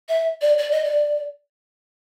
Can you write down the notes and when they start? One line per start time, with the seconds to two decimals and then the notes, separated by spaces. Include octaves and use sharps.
0.09 E5
0.42 D5
0.58 D5
0.71 D#5
0.84 D5